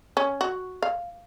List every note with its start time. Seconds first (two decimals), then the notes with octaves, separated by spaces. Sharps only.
0.17 C#4
0.41 F#4
0.82 F5